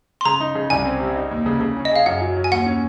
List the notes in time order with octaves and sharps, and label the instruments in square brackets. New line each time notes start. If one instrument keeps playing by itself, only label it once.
[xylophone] C6
[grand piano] C#3 [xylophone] A#5
[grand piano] D#4
C#3
[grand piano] C2 [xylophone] G#5
[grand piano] C4
C3
D#4
D#2
C#3
C#3
C#4
[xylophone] D#5
[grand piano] G#4 [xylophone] F5
[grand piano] F#2 [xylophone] F#5
[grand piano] F#3
F#3
[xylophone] G#5
[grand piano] D#2 [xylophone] F#5
[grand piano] C#4